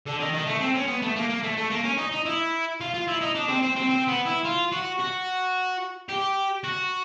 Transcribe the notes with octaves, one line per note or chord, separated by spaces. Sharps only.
D3
D#3
D#3
A3
C4
C#4
B3
A3
A#3
A#3
A3
A3
A#3
C#4
D#4
D#4
E4
F4
F4
E4
D#4
D4
C4
C4
C4
C4
B3
E4
F4
F#4
F#4
G4
F#4